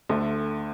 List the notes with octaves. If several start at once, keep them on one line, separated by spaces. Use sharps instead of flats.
D2 D3 A3